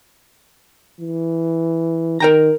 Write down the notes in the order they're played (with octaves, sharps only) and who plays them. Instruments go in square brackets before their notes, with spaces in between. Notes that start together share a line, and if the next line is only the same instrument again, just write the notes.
[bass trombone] E3
[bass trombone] D#3 [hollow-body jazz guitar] A#4 G5 A#5